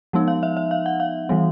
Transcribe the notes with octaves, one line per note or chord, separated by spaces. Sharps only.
F3 G#3 B3 D#4
F5
E5
E5
F5
F#5
F5
E3 G3 B3